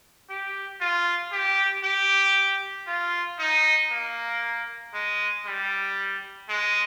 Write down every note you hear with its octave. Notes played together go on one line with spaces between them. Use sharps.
G4
F4
G4
G4
F4
D#4
A#3
G#3
G3
G#3